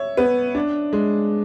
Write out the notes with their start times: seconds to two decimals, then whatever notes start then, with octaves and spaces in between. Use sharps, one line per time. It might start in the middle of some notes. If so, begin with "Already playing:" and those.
Already playing: C#5 E5
0.17 B3
0.55 D4
0.93 G#3